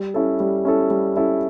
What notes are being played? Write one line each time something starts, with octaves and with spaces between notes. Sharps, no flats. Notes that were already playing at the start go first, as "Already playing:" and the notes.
Already playing: G3
C#4 E4 A4
G3
C#4 E4 A4
G3
C#4 E4 A4